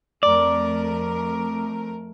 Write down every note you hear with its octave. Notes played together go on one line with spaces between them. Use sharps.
F2 A3 A#4 D5